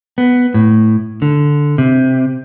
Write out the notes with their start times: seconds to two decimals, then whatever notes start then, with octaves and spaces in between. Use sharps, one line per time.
0.18 B3
0.54 A2
1.22 D3
1.78 C3